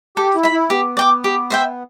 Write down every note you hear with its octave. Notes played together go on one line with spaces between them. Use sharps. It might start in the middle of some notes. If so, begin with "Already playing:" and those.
G4 A4
E4
E5 B5
E4
B3 G4
D5 G5 D6
G4
C5 E5 G5